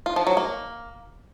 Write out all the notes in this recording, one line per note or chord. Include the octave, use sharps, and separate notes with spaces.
F4
F3
F#3
A#3